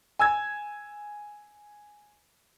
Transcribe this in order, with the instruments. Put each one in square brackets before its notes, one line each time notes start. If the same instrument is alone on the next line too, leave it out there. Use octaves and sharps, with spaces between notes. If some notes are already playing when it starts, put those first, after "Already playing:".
[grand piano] G#5 E6 G#6